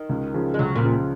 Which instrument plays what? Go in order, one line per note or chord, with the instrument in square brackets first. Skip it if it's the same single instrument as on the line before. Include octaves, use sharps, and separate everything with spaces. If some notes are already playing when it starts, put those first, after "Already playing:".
Already playing: [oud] D#3
[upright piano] C#2
C#3 F3
[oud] G#3
[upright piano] C#2 [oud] F#3
[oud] A#2
[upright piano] C#3 F3